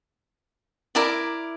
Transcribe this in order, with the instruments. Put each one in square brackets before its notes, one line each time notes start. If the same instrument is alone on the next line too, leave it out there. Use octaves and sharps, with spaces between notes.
[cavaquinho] E4 A#4 D5